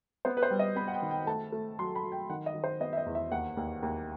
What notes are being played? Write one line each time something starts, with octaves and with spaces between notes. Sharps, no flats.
B3 C5
B4
C5
G3
D#5
B3 B5
F#5
G5
D#3
G5
A3 A5
A3
F#3 C6
B5
F#3
G5
D#3 F#5
D#5
D#3
C5
B3 D#5
E5
D#5
E2
E5
D#2 F#5
D#2
D#2